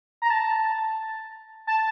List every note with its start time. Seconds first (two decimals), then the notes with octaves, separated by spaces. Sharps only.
0.22 A#5
0.30 A5
1.67 A5